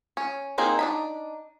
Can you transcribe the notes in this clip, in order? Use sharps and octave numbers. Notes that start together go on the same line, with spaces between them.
C#4
A#3 C4 D#4 G#4 A#4
D4 D#4 B5